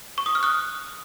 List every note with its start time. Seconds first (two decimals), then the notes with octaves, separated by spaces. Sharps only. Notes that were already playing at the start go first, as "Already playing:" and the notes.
0.18 C#6
0.26 D#6
0.35 F6
0.43 D#6 F#6